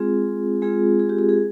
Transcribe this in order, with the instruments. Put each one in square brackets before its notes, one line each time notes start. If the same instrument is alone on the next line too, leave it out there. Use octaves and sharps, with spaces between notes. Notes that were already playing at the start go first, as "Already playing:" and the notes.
Already playing: [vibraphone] G#3 C4 F4 G#4
G#3 C4 F4 G#4
G#4
G4
G#4
G#4